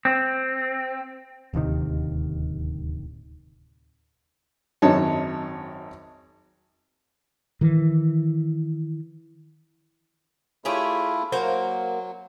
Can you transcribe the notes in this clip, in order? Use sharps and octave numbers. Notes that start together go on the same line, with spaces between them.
C4
D1 D#2 C3 D#3
G#1 F#2 D#4 C#5 A5
D#3 E3
A3 E4 F4 G4 G#4 C#5
F#3 A#3 F#4 C5